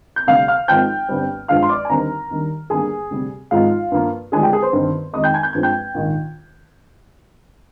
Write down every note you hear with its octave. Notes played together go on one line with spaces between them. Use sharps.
G6
D2 C3 G3 D4 F5 F6
F5 F6
G#1 G#2 F3 C4 D#4 G5 G6
G1 G2 D3 G3 C4
G2 F3 G#3 D4 F5 F6
C6
D5 D6
G#5
D#2 D3 G3 C4 D#4 A#4 A#5
D#2 D#3 G3 D4
G1 G2 D3 G3 A#3 G#4 G#5
D2 C3 G3
G#1 G#2 F3 G#3 D#4 F4 F5
G2 F3 A#3
D2 D3 F3 G#3 D4 G#4 G#5
G4 G5
G#4 G#5
C5 C6
G1 G2 D#3 G3 C4
F2 D#3 G#3 D#4 D#5 D#6
G5 G6
G#5 G#6
G6
G2 F3 G#3 C4 G#6
G5 G6
A#1 G#2 D#3